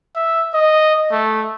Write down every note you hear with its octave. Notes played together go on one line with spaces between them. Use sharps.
E5
D#5
A3